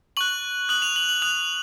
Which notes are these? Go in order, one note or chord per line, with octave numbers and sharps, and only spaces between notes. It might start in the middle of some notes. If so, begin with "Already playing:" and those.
C#6 F#6 F#7
D#6 F#6 F#7
F7
F#7
F#7
D#6 F#6 F7